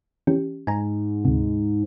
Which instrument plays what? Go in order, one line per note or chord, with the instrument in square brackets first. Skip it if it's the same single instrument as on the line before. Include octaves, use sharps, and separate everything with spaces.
[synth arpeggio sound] E3 C#4 G4
[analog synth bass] G#2 [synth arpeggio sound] G#5 A#5
[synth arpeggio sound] D2 C3